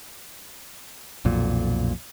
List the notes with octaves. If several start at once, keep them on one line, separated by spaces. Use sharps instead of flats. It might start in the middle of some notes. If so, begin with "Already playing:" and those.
B1 F2 A#2